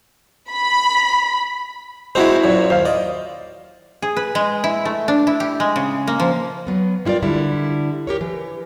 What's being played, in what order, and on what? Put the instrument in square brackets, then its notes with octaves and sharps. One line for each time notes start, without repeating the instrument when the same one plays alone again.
[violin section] B5
[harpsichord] G#3 C4 D#4 [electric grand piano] E4 F#4 C5
[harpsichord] F#2 A#2
[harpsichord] D#2 [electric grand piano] C5 F5
[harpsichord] D5 [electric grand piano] D#5
[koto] G#4
B4
G#3
E4
A3
D4
E4
G4
G#3
C#3
A#3
F3
[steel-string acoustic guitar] F#3 B3
G3 E4 F4 A#4 D5
D3 G3 E4
G4 A#4 C#5
E3